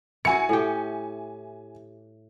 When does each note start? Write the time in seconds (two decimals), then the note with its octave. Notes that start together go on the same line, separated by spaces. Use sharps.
0.25 E4 F#4 G#5 C#7
0.49 A2 G4